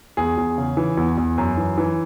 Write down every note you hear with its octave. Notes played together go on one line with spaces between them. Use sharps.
E2 G#4
E2
C#3
E3
E2
E2
F#2
E3
E3